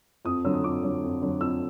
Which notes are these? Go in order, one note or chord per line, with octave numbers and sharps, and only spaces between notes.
F2 D#6
D3 F#3 E6
D#6
F2 D6
D3 F#3
F2
D3 F#3
F2 E6